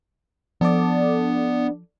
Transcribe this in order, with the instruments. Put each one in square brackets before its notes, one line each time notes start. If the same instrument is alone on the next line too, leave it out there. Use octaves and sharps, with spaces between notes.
[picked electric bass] F3 [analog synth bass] B3 [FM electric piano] D4 A4 D5